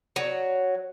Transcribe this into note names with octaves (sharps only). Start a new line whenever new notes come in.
F#3